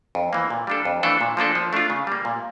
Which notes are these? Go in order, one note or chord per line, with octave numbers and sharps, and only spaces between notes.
F2
E3 A#3
A#2
G3 D4 A4
F2
E3 A3 D4 A4
A#2
F3 A#3 D4 A4
F3
A3 D4 F4
C#3
G3 A#3
A#2